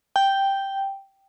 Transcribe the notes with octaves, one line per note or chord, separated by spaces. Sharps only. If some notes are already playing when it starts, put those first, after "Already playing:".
G5